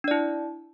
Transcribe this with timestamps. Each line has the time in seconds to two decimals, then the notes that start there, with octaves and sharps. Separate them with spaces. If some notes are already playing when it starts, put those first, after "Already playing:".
0.04 D4
0.08 D5
0.11 E4